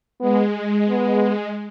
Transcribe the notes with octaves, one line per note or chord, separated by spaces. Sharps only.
G#3 B3
B3